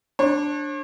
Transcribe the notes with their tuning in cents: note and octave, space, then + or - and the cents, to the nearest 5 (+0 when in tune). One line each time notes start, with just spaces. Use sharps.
D4 +0 C#5 -45